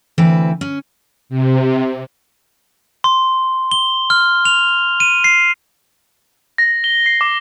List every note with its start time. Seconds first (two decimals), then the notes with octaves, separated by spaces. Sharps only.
0.18 D2 E3 C4 B4
0.61 C#4
1.29 C3
3.04 C6
3.71 G7
4.10 F6
4.45 F7
5.00 D#7
5.24 C7
6.58 A#6
6.84 G7
7.06 C7
7.21 D6